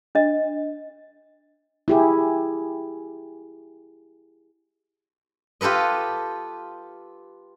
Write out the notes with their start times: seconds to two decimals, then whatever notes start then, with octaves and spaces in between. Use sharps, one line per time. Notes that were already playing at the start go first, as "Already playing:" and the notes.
0.15 D4 D#5
1.88 E4 G4 G#4
5.61 F4 G4 A4 B4 D#5